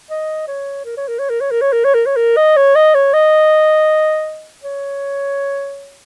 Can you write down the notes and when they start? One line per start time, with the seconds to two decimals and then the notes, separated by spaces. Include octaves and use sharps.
0.10 D#5
0.48 C#5
0.85 A#4
0.97 C#5
1.08 A#4
1.19 C#5
1.30 A#4
1.41 C#5
1.51 A#4
1.62 C#5
1.72 A#4
1.85 C#5
1.94 A#4
2.06 C#5
2.16 A#4
2.37 D#5
2.56 C#5
2.75 D#5
2.95 C#5
3.14 D#5
4.64 C#5